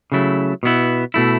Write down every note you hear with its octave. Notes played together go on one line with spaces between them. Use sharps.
C#3 F#3 A3 E4
B2 B3 E4
B2 A3 E4